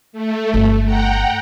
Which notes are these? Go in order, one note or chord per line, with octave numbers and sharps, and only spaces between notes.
A3
G1
F#5 G5 A#5